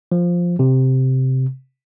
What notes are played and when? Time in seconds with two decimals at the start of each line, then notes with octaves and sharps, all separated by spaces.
0.12 F3
0.59 C3